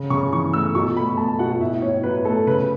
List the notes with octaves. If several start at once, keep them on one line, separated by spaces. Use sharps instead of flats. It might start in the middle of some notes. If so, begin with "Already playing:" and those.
Already playing: C#3
C#3 C#6
E3 C#6
A3 E6
B2 C#6
A3 B5
A3 A5
B2 F#5
A2 E5
A2 C#5
F#3 B4
A3 A4
C#3 B4